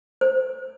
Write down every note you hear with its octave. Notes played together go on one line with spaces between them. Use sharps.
C5